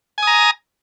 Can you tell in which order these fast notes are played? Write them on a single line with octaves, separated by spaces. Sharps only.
G#5 D#6 A#5